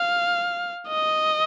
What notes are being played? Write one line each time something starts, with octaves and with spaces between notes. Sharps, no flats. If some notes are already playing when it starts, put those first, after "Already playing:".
Already playing: F5
D#5